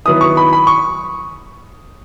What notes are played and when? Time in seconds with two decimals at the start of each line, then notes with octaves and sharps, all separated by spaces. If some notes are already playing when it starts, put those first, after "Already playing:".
0.05 D#3 F#3 B3 E4 D#6
0.21 C#6
0.37 B5
0.53 B5
0.67 C#6